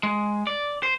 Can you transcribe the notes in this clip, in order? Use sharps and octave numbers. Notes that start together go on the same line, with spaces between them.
G#3
D5
C5